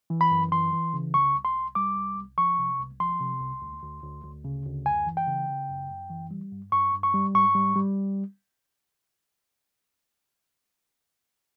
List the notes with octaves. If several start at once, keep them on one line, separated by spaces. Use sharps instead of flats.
E3
B5
F#2
E3 C6
E3
C#3
C2 C#6
C2
C6
C2
G3 D6
C2
C2
F3 C#6
C3
C2
F3 C6
C3
C2
D2
D2
D2
D2
C#3
D2
F#2 G#5
E3
G5
C#3
C#3
F#2
F#2
E3
G3
G2
G2 C#6
G2
C#6
G3
G#2 C#6
G3
G3